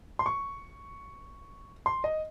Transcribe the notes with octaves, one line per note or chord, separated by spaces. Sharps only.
C6
C#6
C6
D#5